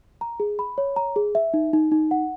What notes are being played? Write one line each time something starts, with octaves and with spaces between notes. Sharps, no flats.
A#5
G#4
B5
C#5
A#5
G#4
E5
D#4
D#4
D#4
F#5